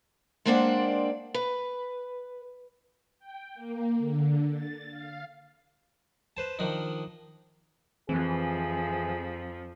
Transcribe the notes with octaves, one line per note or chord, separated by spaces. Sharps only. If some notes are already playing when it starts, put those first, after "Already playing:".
G#3 A#3 C4 D4 D5 F#5
B4
G5
A#3
D3
A6
F5
B4 C5 A5
D#3 F3 D4 D#4
F2 E3 F3 C4 G#4